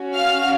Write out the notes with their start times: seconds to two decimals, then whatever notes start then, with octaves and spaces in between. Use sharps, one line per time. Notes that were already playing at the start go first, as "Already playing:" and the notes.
Already playing: C#4 F#4
0.13 F5 F6